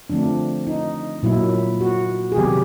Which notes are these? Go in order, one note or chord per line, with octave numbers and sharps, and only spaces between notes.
D3 F3 A3 C4 D4
D#4
A#2 F#3 A#3 E4
F#4
G#4
C3 D#3 F#3 B3 G4